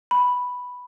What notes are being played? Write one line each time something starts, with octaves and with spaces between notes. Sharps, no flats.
B5